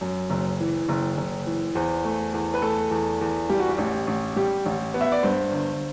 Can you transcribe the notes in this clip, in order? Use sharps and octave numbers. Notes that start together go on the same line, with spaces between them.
F#2
F#1
E3
F#1
F#1
E3
E2 C5
A3
E2
B4
A3 A4
E2
E2
G3 G4
F#4
G4
A1
A1
G3 G4
A1
B3
E5
D5
G2 C5
G1